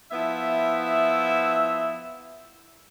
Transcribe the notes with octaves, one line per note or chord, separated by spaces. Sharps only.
F3 B3 E4 E5